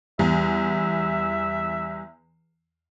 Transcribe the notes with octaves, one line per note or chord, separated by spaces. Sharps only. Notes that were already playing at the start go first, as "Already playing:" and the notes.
E2 G3 E5